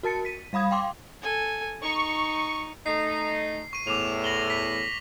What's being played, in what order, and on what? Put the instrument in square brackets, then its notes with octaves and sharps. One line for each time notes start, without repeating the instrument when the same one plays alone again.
[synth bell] F#4 A#4 A5 A6 C#7
B6 D#7
G3 F5 B5 D#6 G#6
F5 G5 C6 D6
[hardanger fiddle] A4 G#5
[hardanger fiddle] D#4 [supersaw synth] C#6
[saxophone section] A3 D#4 [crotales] C7
[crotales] C#6 D#7
[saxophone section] E2 A2 [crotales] D6 F7
[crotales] A#6 F#7 G7
B6